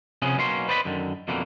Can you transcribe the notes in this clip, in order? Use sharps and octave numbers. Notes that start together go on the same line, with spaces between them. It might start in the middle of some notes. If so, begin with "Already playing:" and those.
C3 F3 B3 C#4 G#4
B1 B2 A#3 C#4 C6
B4 C5 D5 D#5 A#5 B5
F#2 D3 D#3
F2 B2 D3 E3 A#3